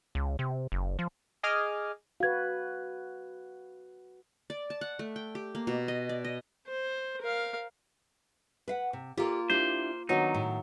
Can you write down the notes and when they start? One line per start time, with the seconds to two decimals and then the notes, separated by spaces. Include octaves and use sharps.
0.15 C#2
0.39 C3
0.72 F#1
0.99 F3
1.43 G#4 D#5 G#5 D6 D#6 F6
2.20 F#4 B4 F5 G#6
4.50 D5
4.70 A5
4.81 F#5
4.99 A3
5.16 G5
5.35 G4
5.55 A#3
5.67 B2
5.88 D#5
6.09 D5
6.24 D#5
6.67 C5
7.22 A#4 F5
8.68 B4 F5 F#5
8.93 C3
9.17 A#3 F4 G4 A4 D5
9.50 D4 E4 G4 C5
10.09 D#3 F#3 B3 D4 D#4
10.35 A2